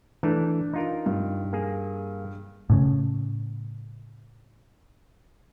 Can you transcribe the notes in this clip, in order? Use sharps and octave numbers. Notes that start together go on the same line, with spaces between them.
E3 A3 D4
D#4 F4 A#4
G2
A#3 G#4
A2 C#3